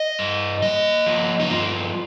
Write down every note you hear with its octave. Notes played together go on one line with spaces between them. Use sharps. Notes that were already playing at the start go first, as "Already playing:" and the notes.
Already playing: D#5
G2
A#3 D#5
F3
D#4
G2 F4